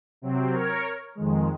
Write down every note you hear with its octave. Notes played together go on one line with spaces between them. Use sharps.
C3 F#3 C4
A#4 C#5
F2 D#3 G#3